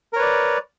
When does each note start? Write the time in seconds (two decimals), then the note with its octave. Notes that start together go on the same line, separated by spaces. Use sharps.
0.13 A#4
0.16 C#5
0.19 B4
0.22 D5